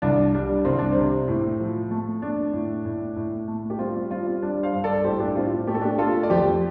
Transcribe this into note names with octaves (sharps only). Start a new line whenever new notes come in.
C2 D4
G3 D4
C2 C4
D4
C3 C4
A2
F3
A3
A3 D4
A2
A2
A2
A3
G4
G3 C4 F4
G3 C4 F4
G3 D4
C5 F5
G2
A4 D5
A2 G4 C5
D4 G4
A2 C4 F4
A3 G4
A4
D4 G4
A3 F4 A4
D5
F2 G4 C5